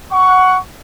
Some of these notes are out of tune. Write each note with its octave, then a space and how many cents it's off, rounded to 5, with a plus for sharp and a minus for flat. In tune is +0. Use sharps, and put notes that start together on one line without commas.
F#5 +0 C#6 +15